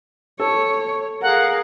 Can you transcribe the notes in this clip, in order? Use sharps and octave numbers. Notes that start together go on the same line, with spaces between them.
A4 C#5
G#4 A#4 F5 F#5